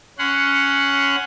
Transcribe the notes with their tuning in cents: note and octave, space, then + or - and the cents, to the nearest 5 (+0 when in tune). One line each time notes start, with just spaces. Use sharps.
C#4 +5 F#5 +0 C6 -35